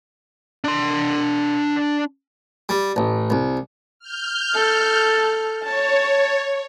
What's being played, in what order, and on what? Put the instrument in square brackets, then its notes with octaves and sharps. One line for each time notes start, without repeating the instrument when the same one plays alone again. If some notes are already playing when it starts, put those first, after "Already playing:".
[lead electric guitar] D4 C6
[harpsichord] G3
A1
C2
[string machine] F6 G6
[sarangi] A4
[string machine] C#5 [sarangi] A5